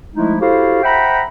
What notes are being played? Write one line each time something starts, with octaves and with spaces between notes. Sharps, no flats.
F3 G#3 A3 D#4 E4
E4 F#4 G4 A4 C5 F5
C5 E5 F#5 G5 A#5 B5